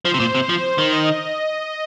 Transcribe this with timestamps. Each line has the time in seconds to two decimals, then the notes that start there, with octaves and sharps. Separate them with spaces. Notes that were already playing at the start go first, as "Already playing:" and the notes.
0.05 F3 C5
0.14 C3
0.20 A#2
0.35 C3
0.49 F3
0.78 D#3
0.92 D#5